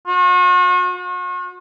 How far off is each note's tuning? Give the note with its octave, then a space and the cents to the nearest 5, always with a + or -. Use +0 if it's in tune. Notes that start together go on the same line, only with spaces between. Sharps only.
F#4 -40
F#4 -45